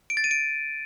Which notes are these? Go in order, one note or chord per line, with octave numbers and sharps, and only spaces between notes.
D7
A6
D#7
D7